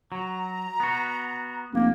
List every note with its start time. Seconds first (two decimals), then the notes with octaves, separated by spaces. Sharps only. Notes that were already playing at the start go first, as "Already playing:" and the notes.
0.12 F#3 A#5
0.80 B3 F#4
1.73 F1 A#3